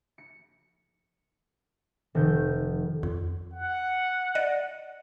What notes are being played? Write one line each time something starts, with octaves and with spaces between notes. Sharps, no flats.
C#7
F1 D#3 G6
F2
F#5
D5 D#5